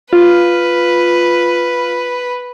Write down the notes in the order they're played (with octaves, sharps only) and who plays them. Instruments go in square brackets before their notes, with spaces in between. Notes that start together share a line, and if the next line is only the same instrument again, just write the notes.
[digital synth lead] F4 [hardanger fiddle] B4